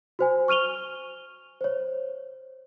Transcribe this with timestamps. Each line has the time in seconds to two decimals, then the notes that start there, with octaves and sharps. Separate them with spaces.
0.19 F#4 C5 G#5
0.48 C#6 F6 D#7 F7 G7
1.61 C5 C#5